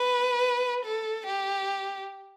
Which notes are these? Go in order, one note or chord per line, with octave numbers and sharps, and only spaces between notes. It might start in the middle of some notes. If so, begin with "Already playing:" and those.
Already playing: B4
A4
G4